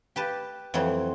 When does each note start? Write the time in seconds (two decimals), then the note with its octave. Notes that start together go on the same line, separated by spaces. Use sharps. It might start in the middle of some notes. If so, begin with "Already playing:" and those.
0.16 G4 B4 A5
0.74 F2 E3 F#3 C4